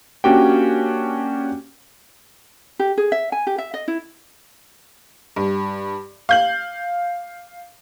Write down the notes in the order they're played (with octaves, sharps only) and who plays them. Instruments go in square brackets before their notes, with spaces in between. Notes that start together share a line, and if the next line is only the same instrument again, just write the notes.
[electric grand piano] A#3 C#4 D4 F#4 G4 G5
[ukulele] G4
G#4
E5
G#5
G4
E5
D#5
E4
[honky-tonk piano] G2
F5 G6 F#7